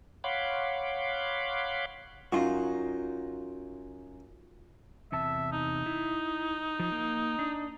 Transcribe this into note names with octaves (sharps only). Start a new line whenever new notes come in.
C#5 F5 F#5 B5 C6 D6
F#2 D#4 F4 F#4
E2 C3 E5 A5
D#4
E4
F3
A#3
D4